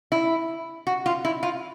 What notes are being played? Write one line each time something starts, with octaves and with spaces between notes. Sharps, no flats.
E4
F#4
F4
E4
F4